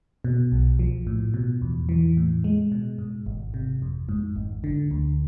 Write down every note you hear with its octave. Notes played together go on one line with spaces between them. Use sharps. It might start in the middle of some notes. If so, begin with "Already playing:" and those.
B2
B1
F3
A2
B2
E2
E3
A2
G#3
B2
G#2
G#1
C3
F2
G#2
G#1
D3
D2